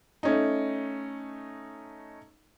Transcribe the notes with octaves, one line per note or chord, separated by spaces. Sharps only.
A3 C#4 D#4